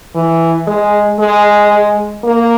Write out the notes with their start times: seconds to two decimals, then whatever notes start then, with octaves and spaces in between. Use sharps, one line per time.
0.15 E3
0.67 G#3
1.19 G#3
2.24 A#3